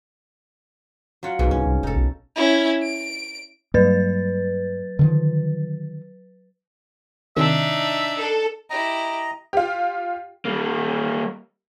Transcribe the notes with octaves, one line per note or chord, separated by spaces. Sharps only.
F#3 F4 F#5
B1 G#2 B2
C2 C#4
C2
F1 D#4 A4
B1
C#4 E4
D7
G2 F#3 B4 A6
D3 D#3 F3
C3 D#3 D4 D#4 E5
A4
E4 G4 D#5 A#5
F4 G4
G3 A#3